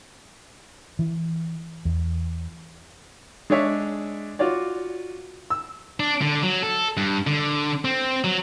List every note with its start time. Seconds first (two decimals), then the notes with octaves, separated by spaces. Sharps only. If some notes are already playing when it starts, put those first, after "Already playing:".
0.99 E3
1.85 E2
3.50 G#3 D4 G#4 C#5 E5
4.39 F4 F#4 C#5 D5
5.50 E6
6.00 D4
6.22 D3
6.43 F#3
6.63 A4
6.97 G2
7.27 D3
7.85 C4
8.24 F#3